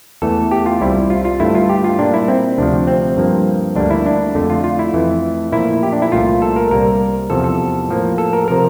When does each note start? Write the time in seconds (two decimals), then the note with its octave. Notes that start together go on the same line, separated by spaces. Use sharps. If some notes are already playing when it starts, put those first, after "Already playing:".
0.22 E2 E3 A3 A4
0.51 G4
0.66 F4
0.81 C2 C3 G3 E4
1.10 F4
1.25 F4
1.40 G2 D3 A3 E4
1.55 F4
1.69 G4
1.84 F4
1.98 A#2 G3 A#3 D4
2.14 E4
2.28 C4
2.58 D2 C3 F3 D4
2.87 C4
3.17 G2 F3 A#3
3.76 D2 D3 G3 A#3 D4
3.90 E4
4.06 D4
4.35 F2 D3 A3
4.50 F4
4.64 F4
4.79 E4
4.94 F2 E3 A3
5.52 A#2 F3 A3 E4
5.83 G4
5.93 D4
6.02 E4
6.12 C2 A#2 A3 F4
6.42 A4
6.56 A#4
6.71 C2 C3 G3 A#3 A#4
7.30 E2 C3 F3 A4
7.44 A4
7.89 A2 F3 A#3
8.18 A4
8.33 A#4
8.48 C3 F3 A#4